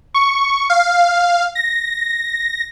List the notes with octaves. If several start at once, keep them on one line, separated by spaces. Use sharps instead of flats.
C#6
F5
A#6